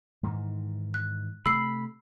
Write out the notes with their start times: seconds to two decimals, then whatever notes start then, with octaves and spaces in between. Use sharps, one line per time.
0.23 G#2 D#3 E3
0.94 F#6
1.46 C3 A3 B5 E6 C7